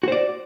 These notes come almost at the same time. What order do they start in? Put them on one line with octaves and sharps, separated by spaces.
F#4 C5 D5